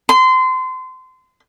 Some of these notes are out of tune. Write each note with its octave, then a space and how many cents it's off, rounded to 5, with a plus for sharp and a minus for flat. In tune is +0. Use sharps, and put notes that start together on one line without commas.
C6 -25